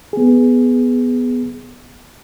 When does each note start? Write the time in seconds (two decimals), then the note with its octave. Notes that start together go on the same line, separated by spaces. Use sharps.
0.13 B3 G#4